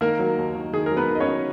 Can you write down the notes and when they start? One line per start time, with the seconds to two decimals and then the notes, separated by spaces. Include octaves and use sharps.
0.01 D#3 A#3 A#4
0.19 F#3
0.37 D#2
0.55 D#3
0.73 D#3 G#4
0.86 A#4
0.91 F#3
0.97 B3 B4
1.09 D#3
1.15 D#5
1.20 C#4 C#5
1.27 F#3